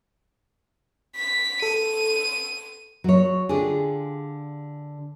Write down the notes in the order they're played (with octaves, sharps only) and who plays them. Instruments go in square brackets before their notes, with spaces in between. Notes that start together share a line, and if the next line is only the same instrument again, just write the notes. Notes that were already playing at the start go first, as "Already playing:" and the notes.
[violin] B6
[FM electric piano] A4 [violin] D#7
[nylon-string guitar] F#3 C#5
D3 D4 F4 G4 G#4